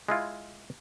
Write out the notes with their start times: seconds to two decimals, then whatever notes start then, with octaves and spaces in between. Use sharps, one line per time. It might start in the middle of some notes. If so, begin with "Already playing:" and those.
0.09 G#3 E4 F4